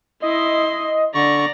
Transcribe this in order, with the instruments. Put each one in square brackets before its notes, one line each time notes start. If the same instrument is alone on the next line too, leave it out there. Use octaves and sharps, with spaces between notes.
[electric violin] E4 C6 [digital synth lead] D#5
[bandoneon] D3 C#6 [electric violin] D5 A#5